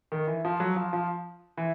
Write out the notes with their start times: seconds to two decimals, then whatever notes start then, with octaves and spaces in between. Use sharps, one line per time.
0.12 D#3
0.27 E3
0.45 F3
0.60 F#3
0.76 F3
0.93 F3
1.57 E3